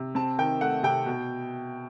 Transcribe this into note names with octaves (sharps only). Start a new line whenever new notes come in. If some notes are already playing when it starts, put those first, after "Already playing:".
Already playing: C3
C4 A5
D#3 G5
A3 F#5
C3 G5
B2